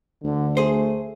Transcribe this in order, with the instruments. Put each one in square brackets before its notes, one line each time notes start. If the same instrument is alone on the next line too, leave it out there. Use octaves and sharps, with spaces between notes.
[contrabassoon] D2 [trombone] D3
[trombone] A3 [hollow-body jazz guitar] G#4 C5